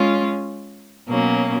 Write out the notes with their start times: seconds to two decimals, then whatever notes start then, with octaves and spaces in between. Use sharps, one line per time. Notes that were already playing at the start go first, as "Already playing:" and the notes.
Already playing: G#3 C#4 F4
1.10 B2 F#3 A#3 C#4